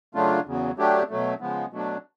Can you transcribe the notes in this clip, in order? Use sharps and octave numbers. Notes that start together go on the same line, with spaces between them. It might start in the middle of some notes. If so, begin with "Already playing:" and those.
C#3 F#3 A3 D4 F4
E2 C#3 F#3
F#3 A3 D4 G4
B2 F#3 A3
C#3 F3 G#3 B3
B2 F#3 A3 D4